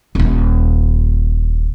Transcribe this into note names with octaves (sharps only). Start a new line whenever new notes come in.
D#1 D#2